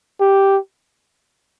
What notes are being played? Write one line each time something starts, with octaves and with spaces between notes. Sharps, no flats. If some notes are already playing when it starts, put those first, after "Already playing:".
G4